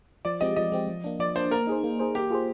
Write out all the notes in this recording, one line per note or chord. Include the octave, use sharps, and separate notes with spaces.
F3 D5
G#3 C4 G4 D#5
F3 D#5
G#3 C4 G4
F3
A#3 D4
F3 D5
A#3 D4 C5
A#3 A#4
D#4 G#4 C5
A#3
D#4 G#4 C5
A#3 G4
F4 G#4 C5